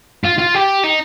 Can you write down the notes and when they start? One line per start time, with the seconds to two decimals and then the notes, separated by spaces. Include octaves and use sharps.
0.24 F4
0.38 F4
0.54 G4
0.83 D#4